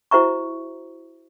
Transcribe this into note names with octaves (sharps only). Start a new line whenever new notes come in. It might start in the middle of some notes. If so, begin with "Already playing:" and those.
E4 F#4 C5 E5 A#5 C#6